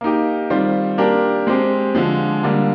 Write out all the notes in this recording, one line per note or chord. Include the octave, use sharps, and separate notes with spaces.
A#3 D#4 G4
D#3 G3 C4 F4 C5
A#3 D4 G4 A#4
G#3 C4 G4
D3 F3 G#3
D3 G3 A#3